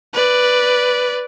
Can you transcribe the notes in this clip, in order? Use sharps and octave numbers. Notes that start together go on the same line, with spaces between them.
B4 D5